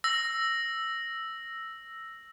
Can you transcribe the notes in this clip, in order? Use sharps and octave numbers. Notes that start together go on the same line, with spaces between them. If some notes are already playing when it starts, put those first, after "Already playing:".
E6 A#6